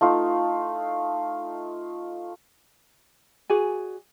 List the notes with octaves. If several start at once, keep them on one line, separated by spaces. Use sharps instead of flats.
A3 D#4 F4
F#4 G#4 D5 G#5